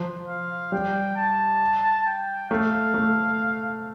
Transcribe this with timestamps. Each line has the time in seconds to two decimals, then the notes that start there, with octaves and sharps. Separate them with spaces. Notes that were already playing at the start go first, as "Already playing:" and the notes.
Already playing: F3
0.28 F5
0.72 G3 G5
1.17 A5
2.06 G5
2.50 A3 F5
2.94 A3